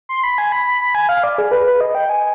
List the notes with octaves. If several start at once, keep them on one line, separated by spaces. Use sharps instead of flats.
C6
B5
G#5
B5
B5
B5
G#5
F5
D5
G#4
B4
B4
D#5
G5
G#5